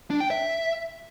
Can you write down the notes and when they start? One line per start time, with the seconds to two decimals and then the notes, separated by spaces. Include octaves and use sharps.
0.10 D4
0.20 G5
0.30 E5